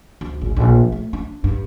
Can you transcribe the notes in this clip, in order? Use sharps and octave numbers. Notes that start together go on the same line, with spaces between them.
D2
G#1
A#1
A3
D4
G2